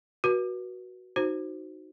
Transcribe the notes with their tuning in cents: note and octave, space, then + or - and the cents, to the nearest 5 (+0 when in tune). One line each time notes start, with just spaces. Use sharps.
F#4 +0 B4 -35
D#4 +0 F#4 +0 C5 -5